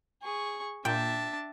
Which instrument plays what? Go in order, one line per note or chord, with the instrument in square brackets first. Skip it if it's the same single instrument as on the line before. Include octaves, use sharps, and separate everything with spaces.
[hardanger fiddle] G#4 C#6
[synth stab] A#2 [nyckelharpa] D4 A5 [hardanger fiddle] E5 [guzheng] G5